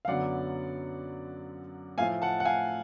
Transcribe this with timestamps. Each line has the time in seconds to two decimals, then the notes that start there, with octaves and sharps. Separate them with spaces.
0.05 F5
0.08 F#2 D3 F#3 B3 D5 F#5
1.98 A2 F3 A3 F5 G#5
2.22 F#5 A5
2.40 F#5
2.45 F5 G#5